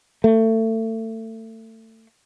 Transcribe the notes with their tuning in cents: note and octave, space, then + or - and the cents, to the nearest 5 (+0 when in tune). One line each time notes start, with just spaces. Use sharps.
A3 +25